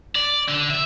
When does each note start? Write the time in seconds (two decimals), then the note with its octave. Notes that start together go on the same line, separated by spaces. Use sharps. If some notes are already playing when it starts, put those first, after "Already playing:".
0.16 D5
0.49 D3
0.70 E5